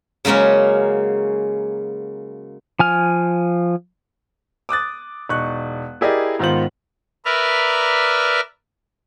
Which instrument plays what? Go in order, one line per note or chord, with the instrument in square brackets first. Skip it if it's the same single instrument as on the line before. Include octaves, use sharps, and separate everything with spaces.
[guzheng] C#3 F#3 G#3 A#3 C#4
[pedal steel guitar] F3 G#5 F6
[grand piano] D6 D#6 F#6 A6
E1 D#4 C#6 F#6
E4 G4 G#4 A#4 D5 D#5
G#2 D#3 B3 F4 C5 F#7
[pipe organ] A#4 B4 D5 E5 F6